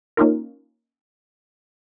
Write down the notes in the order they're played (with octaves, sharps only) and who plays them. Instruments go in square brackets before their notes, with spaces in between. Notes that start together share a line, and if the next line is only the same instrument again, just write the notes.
[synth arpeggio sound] A#3 C#4 D#4 F4 A#4